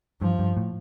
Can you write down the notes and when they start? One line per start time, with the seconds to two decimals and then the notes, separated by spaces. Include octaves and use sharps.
0.21 G2 F3
0.39 G2
0.57 A2